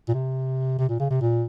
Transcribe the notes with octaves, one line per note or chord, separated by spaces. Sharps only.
A#2
C3
C3
A#2
C#3
C3
A#2